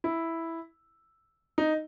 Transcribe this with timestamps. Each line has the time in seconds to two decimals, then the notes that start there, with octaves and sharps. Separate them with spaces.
0.04 E4
1.58 D#4